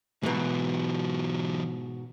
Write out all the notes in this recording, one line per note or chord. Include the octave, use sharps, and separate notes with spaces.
G#2 B2 E3 F#3